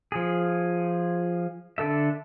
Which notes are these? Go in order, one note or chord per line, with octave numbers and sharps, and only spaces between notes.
F3 G#4
D3 A4 E5